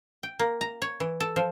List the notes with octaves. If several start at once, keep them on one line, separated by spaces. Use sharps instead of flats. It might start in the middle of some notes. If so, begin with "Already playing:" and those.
G5
A#3
A#5
C#5
E3
A4
F3